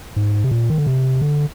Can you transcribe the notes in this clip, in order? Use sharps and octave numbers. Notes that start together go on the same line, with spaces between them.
G#2
C3
A#2
D#3
D3
C3
D3